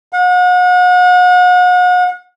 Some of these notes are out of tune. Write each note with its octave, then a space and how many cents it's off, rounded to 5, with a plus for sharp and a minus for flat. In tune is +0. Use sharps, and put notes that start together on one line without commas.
F#5 -40